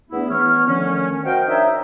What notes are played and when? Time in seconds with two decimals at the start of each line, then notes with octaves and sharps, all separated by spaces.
0.10 E2 A3 B3 D4 E4
0.30 E3 B3 C#5 F6
0.67 D3 D#3 F3 A3 C#4
1.24 F#4 A#4 C5 D#5 F5 G5
1.48 D4 D#4 C5 C#5 D#5 E5